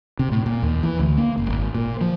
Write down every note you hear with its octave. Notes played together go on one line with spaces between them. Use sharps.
C3
A2
A#2
D#2
E3
D2
A#3
F#1
G#1
A#2
F3